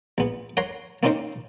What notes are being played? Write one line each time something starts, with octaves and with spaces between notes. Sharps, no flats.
A#1 B3
A#4 C#5 F#5 A#5 C6
A#3 C4 C#4 D#4 A#4 C5